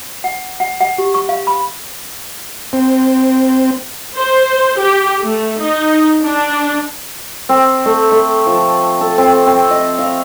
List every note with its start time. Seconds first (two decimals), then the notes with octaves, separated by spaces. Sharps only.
0.24 F#5
0.60 F#5
0.80 F#5
0.98 G4
1.14 C#6
1.29 F5
1.47 B5
2.73 C4
4.14 C5
4.77 G4
5.22 A3
5.60 D#4
6.22 D4
7.49 C4
7.85 A3
8.11 A3
8.46 F3
9.01 A4
9.18 C4
9.46 C4
9.71 D#5
9.99 F5